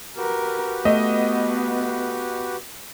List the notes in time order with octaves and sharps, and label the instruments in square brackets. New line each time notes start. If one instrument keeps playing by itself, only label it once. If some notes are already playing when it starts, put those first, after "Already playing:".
[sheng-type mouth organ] F#4 G4 B4 [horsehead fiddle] A#4
[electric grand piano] A3 [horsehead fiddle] B3 [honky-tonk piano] D#5